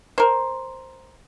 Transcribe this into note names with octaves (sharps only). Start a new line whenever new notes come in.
A#4 C5